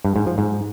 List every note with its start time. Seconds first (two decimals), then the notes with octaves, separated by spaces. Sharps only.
0.05 G2
0.16 G#2
0.27 F3
0.38 G#2